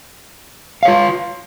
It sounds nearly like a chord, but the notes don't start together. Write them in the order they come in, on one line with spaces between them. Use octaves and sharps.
F5 C#5 F4